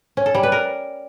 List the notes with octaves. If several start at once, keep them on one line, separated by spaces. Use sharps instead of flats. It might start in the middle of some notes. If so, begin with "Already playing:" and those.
C#4
A4
G3
B4
A#4